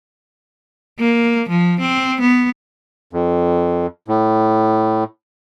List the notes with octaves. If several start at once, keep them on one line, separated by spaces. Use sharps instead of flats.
A#3
F3
C4
B3
F2
A2